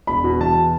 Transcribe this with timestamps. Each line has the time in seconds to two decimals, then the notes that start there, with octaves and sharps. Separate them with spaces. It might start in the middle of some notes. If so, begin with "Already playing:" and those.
0.07 E1 B5
0.24 B2
0.40 E2 A5